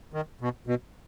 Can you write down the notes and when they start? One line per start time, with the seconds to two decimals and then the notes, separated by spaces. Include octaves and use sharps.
0.13 D#3
0.41 B2
0.67 B2